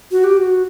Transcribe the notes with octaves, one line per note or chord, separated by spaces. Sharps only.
F#4
G4
F#4